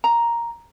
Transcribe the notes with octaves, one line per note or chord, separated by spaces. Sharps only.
A#5